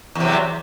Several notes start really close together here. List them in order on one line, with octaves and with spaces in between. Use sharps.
E2 C3 F#3